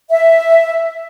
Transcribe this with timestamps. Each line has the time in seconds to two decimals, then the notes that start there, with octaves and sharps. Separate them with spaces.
0.10 E5